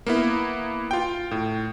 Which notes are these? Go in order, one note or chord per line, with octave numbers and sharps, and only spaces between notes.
A#3 B3 E4
F4 G5
A2